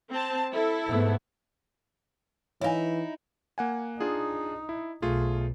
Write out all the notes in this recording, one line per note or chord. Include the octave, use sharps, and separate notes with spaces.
C4 A5
E4 A4
G#2 A3 B3
E3 D#4 E4 C#5 F5 G#5
A#3 F#5 G#5
D4 D#4 F4 G#4
E4
B1 A3 F4 G#4